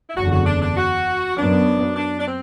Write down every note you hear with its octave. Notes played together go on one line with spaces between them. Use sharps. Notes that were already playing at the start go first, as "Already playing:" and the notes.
E4
F#1 E2 D3 F#4
F#4
D4
D4
F#4
F#2 F#3 B3 D4
D4
D4
C4